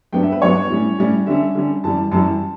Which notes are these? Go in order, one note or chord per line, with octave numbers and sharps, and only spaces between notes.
G2 F#3 B3 D4 G5
E5
B4
G2 F#3 B3 D4 C#5
A2 G3 C#4
A2 G3 C#4
D3 G3 C#4 E5
D3 G3 C#4
F#2 E3 G3 A5
F#2 E3 G3 A5